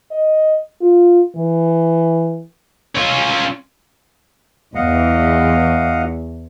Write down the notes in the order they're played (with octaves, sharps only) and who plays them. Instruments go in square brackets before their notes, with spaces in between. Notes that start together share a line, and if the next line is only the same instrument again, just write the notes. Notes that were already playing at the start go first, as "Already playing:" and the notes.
[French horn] D#5
F4
E3
[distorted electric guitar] C#4 F4
[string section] E2 [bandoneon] D#5 F5 F#5